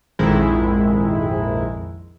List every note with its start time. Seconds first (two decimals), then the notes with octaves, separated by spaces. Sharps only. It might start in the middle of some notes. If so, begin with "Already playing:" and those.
0.19 A#1 F2 G#2 D#3 G#3 E4